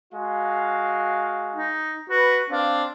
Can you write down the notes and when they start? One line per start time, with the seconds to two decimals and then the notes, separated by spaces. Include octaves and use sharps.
0.14 G#3 F#4 F5
1.56 D#4
2.10 F#4 B4
2.50 C4 D4 F5